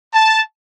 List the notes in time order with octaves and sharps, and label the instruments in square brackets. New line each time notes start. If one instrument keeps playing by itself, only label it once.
[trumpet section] A5